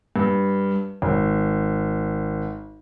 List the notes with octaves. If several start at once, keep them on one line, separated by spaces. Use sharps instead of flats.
G2
G#1